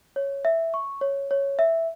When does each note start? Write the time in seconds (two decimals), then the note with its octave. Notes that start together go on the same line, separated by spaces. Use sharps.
0.16 C#5
0.45 E5
0.74 C#6
1.01 C#5
1.31 C#5
1.59 E5